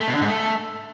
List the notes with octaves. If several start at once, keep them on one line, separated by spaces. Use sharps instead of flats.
A3
B2
D3
G#2
A3